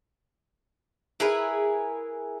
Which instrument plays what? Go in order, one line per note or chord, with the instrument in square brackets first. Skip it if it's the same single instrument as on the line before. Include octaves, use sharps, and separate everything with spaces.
[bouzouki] E4 G#4 A#4 B4